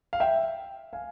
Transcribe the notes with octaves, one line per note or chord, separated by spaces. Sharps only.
F5
E5 G5
F5 G#5